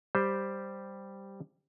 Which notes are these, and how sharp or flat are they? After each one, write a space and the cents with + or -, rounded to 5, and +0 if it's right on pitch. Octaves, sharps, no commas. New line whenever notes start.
G3 +0 G4 +0 C5 +0